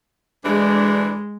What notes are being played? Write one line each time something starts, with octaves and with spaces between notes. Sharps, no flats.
D2 E3 G#3 D4